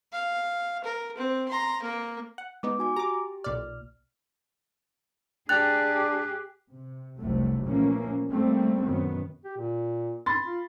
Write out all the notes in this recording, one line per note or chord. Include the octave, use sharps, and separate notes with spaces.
F5
A#4
C4
A#5 C6
A#3 A#4
F#5
G#3 B3 D#4 D6
F#4 G#5 D6
G4 A#5 D6
B1 A#2 D5 F6
D4 G4 G#4 G5 F#6 A6 F7
C3
F1 C2 C3 F#3 A3
A#2 E3 F3 A3 A#3 C#4
G3 A3 A#3 C4
F#2 A#2 D#3 B3
G4
A#2
B5 C6 A6
F4